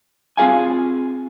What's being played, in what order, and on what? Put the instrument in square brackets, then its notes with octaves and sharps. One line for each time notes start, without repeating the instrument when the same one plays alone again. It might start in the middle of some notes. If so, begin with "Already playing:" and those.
[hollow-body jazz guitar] C4 F4 G#4 F5 G#5